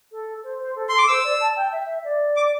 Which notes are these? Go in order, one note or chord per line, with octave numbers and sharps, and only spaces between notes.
A4
C5
C5
A4
A4 C6
D6
A4
C5 E6
D5
A5
G5
E5
D5
D6